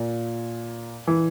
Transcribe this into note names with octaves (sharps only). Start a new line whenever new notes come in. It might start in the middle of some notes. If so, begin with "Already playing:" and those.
Already playing: A#2
E3